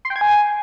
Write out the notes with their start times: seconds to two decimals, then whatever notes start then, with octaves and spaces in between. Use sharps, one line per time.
0.05 C6
0.10 G5
0.16 G#6
0.21 G#5